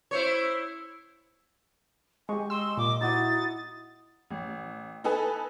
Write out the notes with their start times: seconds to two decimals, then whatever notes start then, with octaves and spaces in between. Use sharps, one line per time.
0.11 E4 C5 C#5
2.29 G#3 G4 G#5 C#6
2.50 D#5 C6 E6
2.77 A#2 D6
3.01 D#4 E4 F#4 D#5 A6
4.30 A1
5.04 D#4 A4 B4 G#5 A5